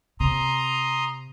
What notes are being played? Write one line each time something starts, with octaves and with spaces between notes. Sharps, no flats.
C3 A#5 C6 D#6